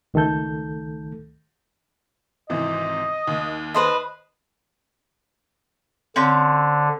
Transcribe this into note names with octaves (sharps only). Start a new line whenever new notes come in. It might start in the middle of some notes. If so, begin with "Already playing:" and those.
C#2 D#3 A3 A4 G6
G#1 C3 E3 D#5
D#2
B4 C5 D#5
D3 C4 C#4 G6